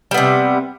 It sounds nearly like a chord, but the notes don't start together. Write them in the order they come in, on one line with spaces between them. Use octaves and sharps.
G3 B3 C3